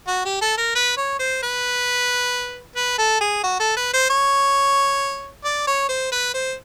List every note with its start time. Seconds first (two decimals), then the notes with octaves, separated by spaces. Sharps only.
0.07 F#4
0.25 G4
0.42 A4
0.58 A#4
0.75 B4
0.97 C#5
1.19 C5
1.43 B4
2.76 B4
2.98 A4
3.21 G#4
3.44 F#4
3.60 A4
3.76 B4
3.93 C5
4.10 C#5
5.44 D5
5.67 C#5
5.89 C5
6.12 B4
6.34 C5